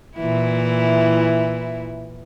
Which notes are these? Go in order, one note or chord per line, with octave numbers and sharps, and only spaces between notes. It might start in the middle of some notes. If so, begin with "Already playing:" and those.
A#2 E3 E4